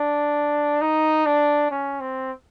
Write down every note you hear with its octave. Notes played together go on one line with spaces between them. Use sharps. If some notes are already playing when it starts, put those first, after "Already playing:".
Already playing: D4
D#4
D4
C#4
C4